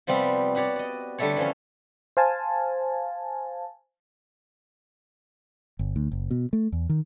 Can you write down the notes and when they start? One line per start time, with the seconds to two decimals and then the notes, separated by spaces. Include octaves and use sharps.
0.07 C3 F3 G3 B3 C4
0.55 F#4 G4 C#5 D5
0.76 D5 D#5
1.18 D3 G3 A3 A4 C#5
1.36 E3 F3 C#4
2.17 C5 F5 G#5 A5
5.79 G1
5.96 D2
6.11 F#1
6.31 B2
6.53 A3
6.72 E2
6.89 D#3